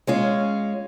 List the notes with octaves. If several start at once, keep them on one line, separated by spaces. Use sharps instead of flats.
G#3 C#4 F4